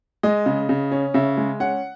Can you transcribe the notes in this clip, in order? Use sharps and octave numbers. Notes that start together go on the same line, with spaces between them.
G#3 D#5
C#3
C#3
C#4
C#3 E5
G#3
C#4 F#5